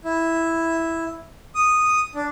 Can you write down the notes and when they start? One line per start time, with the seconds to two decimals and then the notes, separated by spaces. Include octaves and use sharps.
0.05 E4
1.55 D#6
2.15 D4